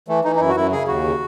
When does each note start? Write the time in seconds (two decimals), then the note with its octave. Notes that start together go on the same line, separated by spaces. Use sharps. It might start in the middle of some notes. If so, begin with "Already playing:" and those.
0.08 E3 A3
0.24 E3 D#4
0.36 D#4
0.40 F#2 E4
0.49 F#4
0.56 F#2 E4
0.72 C#3 G#4
0.88 D#2 F#4
1.04 C#3